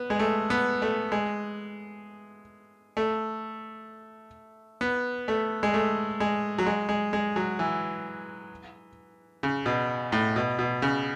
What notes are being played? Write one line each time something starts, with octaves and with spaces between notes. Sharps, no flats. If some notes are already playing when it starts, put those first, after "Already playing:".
Already playing: B3
G#3
A3
B3
A3
G#3
A3
B3
A3
G#3
A3
G#3
F#3
G#3
G#3
G#3
F#3
E3
C#3
B2
A2
B2
B2
C#3